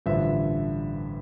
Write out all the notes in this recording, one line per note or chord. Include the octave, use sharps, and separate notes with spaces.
A1 G2 D3 F3 E5